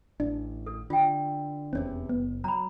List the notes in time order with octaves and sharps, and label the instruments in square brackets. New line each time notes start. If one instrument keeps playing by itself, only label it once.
[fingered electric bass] A1 [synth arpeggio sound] D4
[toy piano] A4
[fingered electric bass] D3 [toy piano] F4 G5
[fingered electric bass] F1 E2 C3 [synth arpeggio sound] C4 C#4
[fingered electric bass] F#1 [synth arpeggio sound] B3
[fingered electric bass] F#3 [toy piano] A#5 B5